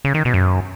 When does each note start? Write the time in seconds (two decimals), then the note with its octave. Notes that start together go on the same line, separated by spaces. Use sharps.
0.05 C#3
0.14 D#3
0.25 B2
0.34 F#2